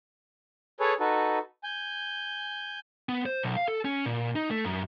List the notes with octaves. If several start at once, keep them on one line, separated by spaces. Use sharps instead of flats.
G#4 A4 B4 C#5
D#4 F#4 A4 B4
G#5 G6
B3
C5
B1
F5
A4
C#4
A#2
D#4
A3
F#2